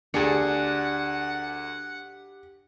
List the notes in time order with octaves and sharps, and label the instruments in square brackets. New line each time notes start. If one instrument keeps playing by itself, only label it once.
[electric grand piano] D2 G#4 C#7 [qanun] D4 [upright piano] G4 [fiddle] F#5